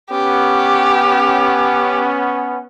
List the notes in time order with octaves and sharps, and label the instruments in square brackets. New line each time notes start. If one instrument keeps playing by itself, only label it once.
[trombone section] B3 C#4 [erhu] G4